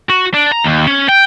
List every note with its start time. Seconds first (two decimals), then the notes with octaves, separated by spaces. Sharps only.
0.09 F#4
0.34 D4
0.52 A#5
0.64 D#2
0.87 C#4
1.09 G5